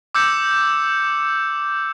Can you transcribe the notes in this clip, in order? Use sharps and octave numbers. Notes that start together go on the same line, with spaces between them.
D6 E6 G6 C#7